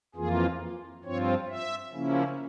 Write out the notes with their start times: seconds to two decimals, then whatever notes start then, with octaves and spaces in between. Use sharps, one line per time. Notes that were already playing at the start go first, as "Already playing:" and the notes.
0.15 F2 E3 A#3 F4 G#4
1.04 G2 F3 C4 F4 C#5
1.49 E5
1.93 C#3 F3 A#3 C#4 E4